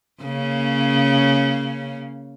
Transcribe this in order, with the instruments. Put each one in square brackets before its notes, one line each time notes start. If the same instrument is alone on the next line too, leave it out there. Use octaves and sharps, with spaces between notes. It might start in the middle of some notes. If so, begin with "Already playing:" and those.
[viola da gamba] C#3 A#3 C#4